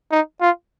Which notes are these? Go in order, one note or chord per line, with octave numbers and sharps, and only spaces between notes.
D#4
F4